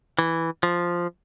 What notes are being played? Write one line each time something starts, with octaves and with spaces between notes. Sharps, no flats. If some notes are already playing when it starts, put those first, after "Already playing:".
E3
F3